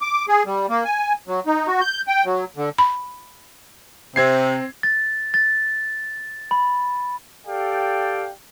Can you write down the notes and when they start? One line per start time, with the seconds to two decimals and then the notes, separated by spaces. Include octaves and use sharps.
0.01 D6
0.28 G#4
0.46 G3
0.70 A#3
0.85 G#5
1.28 F#3
1.46 D#4
1.67 F#4
1.81 G6
2.08 G5
2.25 F#3
2.57 D3
2.78 B5
4.16 C3 C4 G#6 C7
4.83 A6
5.34 A6
6.51 B5
7.47 G4 A4 D5 F5 G5